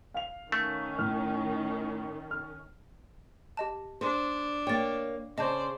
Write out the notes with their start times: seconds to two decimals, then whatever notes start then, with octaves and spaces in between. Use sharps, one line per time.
0.14 F5 F7
0.52 D#3 A3 C#4
0.99 A2 F6
2.31 F6
3.57 G4 D#5 A5
4.01 D4 C5
4.67 A#3 C#5 G5 A6
5.38 C#3 C5 D5 D#5 A5 G6